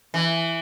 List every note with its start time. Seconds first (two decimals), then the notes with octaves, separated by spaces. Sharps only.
0.14 E3